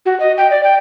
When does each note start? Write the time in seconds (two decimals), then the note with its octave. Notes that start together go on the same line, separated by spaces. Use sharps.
0.06 F#4
0.20 D#5
0.38 G5
0.51 D5
0.64 G5